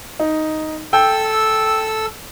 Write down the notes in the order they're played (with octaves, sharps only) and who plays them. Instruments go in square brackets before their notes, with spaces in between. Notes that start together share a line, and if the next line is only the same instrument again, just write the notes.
[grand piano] D#4
[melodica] A4 E6 [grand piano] G5